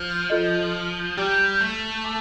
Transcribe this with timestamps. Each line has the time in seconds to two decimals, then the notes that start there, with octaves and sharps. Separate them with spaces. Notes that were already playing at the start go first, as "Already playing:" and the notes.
Already playing: F3
0.30 F4 A4 D#5
1.17 G3 G4 D5 G5 A#5 D6
1.61 A3
2.04 A5 D6